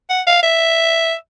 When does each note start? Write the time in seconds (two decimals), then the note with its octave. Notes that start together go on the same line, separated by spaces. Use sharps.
0.10 F#5
0.27 F5
0.43 E5